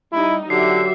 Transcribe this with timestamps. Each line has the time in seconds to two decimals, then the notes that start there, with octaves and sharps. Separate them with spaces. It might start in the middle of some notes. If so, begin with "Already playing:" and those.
0.13 G3 D#4 E4 D#5
0.50 D3 F#3 G4 E5 C7